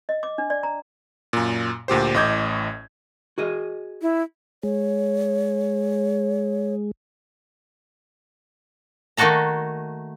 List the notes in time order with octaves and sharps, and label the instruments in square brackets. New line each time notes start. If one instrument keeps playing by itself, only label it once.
[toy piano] D#5
D6
D4
D5
A#5
[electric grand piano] F#2 A#2
D2 A#2 G4 C5
A1 A2 D#5 D6 G6 G#6
[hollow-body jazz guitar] F#4 G#4 D#5
[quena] E4
[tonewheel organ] G#3 [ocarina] C#5
[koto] D#3 A3 A#3 F#4 A4 A#5